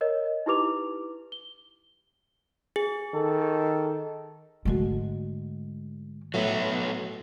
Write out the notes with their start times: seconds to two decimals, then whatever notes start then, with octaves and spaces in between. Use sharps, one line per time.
0.01 A#4 C#5 D#5
0.46 D#4 E4 G4 B4 D6 F7
1.32 G7
2.76 G#4
3.14 D#3 A4
4.65 G#2 D3 G#3 A3 F#4
6.34 A2 F#3 B3 E5